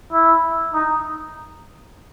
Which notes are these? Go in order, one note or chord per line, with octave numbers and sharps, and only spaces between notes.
E4
D#4